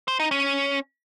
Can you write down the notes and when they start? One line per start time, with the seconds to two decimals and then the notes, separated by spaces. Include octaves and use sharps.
0.08 C5
0.20 D#4
0.31 C#4